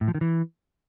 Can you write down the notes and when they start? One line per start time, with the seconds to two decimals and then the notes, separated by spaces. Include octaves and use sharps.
0.01 A2
0.08 F3
0.15 D#3
0.21 E3